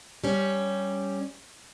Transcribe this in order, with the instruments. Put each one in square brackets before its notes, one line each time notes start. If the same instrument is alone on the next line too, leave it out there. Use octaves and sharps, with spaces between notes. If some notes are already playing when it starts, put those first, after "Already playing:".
[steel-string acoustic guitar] G3 C#4